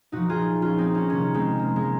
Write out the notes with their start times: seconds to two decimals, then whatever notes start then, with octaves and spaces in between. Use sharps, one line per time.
0.12 A#2 F3 D#4 F#4
0.29 F4 G#4
0.62 C#4 F4
0.78 C4 D#4
0.94 A#3 C#4
1.09 C3 D#3 A#3 C#4
1.34 G#3 C4
1.59 A#3
1.76 G#3